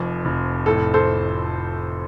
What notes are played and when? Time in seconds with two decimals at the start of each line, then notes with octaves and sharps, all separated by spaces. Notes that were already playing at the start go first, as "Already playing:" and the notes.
Already playing: F1 F2
0.25 F1
0.66 A2 A4
0.94 A4 C5